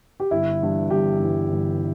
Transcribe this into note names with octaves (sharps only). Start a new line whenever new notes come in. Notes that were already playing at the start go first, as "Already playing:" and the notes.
G4
G1 E4
G2 E3
G1 G4
G2 E3
G1